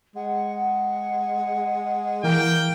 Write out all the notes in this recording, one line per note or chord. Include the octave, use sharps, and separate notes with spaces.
G#3 F#5
E3 A#3 G5